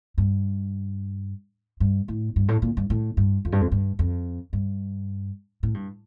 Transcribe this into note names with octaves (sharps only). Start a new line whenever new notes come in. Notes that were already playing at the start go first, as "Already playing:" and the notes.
G2
G2
A2
G2
A2
A#2
G2
A2
G2
F2
G2
F2
G2
F2
G2
A2
G2